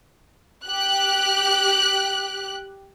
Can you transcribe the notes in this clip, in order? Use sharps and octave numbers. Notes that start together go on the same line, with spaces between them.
G4 F#6